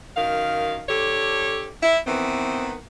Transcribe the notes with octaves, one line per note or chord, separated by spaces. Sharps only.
F#2 D#3 F5
D3 G4 A4 C#5
E4
D#3 E3 B3 C4